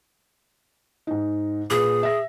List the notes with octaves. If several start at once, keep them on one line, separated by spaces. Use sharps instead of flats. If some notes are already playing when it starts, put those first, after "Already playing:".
G#2 D#4
A#2 G#4 B4
E5 A#6